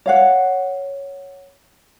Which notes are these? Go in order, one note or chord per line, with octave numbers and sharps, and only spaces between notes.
C#5 F5 F#5